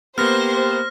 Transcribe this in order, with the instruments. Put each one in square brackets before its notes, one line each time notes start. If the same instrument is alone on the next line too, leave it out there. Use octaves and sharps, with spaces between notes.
[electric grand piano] A#3 B3 [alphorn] G4 [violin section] C5 [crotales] F6 A#6